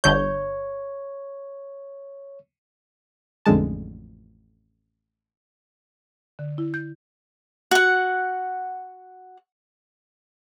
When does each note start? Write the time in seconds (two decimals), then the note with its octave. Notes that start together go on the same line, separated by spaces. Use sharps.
0.04 G1 D3 C#5 G6
3.46 A1 F2 D3 G#3 A5
6.39 D3
6.58 E4
6.74 G6
7.71 F#4 F#5